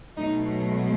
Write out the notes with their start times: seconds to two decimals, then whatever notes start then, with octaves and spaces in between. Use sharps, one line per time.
0.16 B2 F#3 A3 D#4